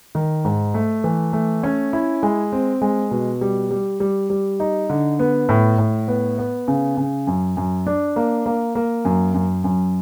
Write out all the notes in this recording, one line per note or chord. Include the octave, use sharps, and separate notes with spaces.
D#3
G#2
A3
E3
A3
C#4
E4
G#3
C4
G#3
B2
G3
G3
G3
G3
D#4
D3
B3
A2
A2
B3
B3
C#3
C#3
F#2
F#2
D4
A#3
A#3
A#3
F#2
F#2
F#2